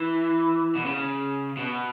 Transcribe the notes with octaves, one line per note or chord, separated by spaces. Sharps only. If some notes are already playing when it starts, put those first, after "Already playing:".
Already playing: E3
B2
C#3
B2